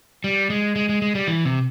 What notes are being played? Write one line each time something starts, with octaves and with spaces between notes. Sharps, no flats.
G3
G#3
G#3
G#3
G#3
G3
E3
C3